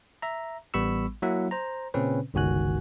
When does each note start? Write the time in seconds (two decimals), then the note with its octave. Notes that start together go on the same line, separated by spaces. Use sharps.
0.22 E5 A#5
0.74 A1 G3 B3 B5 C#6 E6
1.22 F#3 A#3 E4 E5 F#5
1.51 C5 A#5
1.94 A#2 C#3 C4 C#4 B4
2.34 G1 C#2 D#3 F#4 G#5 F#6